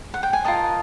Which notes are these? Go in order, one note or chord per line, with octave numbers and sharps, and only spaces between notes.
F#5
G5
G#5
F4 A#4 D#5 A5